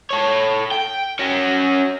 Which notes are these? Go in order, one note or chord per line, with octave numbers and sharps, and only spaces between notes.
A4 C#5
G5
C#4 F#4